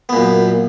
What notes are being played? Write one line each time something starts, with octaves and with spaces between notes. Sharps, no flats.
F#2 A#2 B3